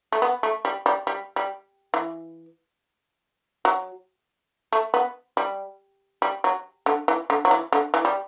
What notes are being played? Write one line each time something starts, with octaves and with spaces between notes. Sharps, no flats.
A3
B3
A3
G3
G3
G3
G3
E3
F#3
A3
B3
G3
G3
F#3
D3
E3
D3
F#3
E3
D3
E3
G3